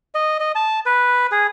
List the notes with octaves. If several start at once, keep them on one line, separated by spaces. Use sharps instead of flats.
D#5
D#5
A5
B4
G#4